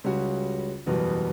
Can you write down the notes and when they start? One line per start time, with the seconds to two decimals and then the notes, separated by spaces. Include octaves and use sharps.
0.04 C#2 C#3 G3 C#4 F#4
0.86 F#1 E2 B2 G3 B3